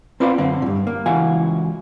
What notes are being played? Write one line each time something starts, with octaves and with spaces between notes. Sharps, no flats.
C4 F4 B4 D5 D#5 F5
F#2 D3 C4
G2 A#2
A#3
C#2 E3 F#4 F5 G#5